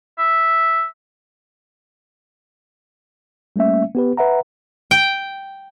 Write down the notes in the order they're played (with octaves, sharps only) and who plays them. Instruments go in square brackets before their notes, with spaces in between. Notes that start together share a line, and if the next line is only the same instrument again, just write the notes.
[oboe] E5
[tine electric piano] G3 A3 A#3 C#4 E5
B3 G4 B4
B4 E5 F#5 A#5
[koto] G5